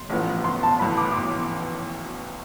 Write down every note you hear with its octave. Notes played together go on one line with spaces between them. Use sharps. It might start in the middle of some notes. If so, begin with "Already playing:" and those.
Already playing: C6
A1 A2 F3 B3
C6
A5
B1 A2 E3 B3 B5
D6
D6
C6